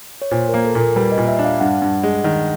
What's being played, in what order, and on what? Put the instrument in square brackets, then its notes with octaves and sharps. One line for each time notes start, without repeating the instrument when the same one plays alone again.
[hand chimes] C#5
[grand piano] A#2 [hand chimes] C5
[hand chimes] A#4
[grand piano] A#3
[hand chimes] A4
[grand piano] A#2
[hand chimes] A#4
[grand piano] G3 [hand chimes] B4
[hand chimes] D#5
[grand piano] A#2
[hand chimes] E5
[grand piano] D4
[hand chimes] F5
[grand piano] G2 [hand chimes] F#5
[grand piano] G2
G#3
D#3